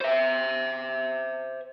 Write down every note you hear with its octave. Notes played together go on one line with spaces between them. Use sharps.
C5 E5